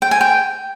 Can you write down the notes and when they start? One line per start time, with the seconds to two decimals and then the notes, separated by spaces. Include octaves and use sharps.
0.02 G5
0.11 G#5
0.21 G5